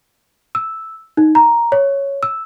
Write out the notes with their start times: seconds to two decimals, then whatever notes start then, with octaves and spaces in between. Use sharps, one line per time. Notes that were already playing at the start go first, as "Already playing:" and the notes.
0.55 E6
1.17 D#4
1.35 A#5
1.72 C#5
2.23 E6